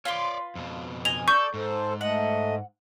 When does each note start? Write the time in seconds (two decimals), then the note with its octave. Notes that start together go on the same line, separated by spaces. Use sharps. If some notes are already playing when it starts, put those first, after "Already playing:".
0.05 F4 B4 C#5 D5 C6
0.55 F2 B2
1.05 D#5 G#5 F7
1.28 A4 D5 C#6 G6
1.54 G#2 A4 C5
2.01 A3 D#5 F#5